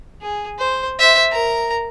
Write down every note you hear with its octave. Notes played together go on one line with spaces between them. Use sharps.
G#4
C5
C5 E5
A#4 A#5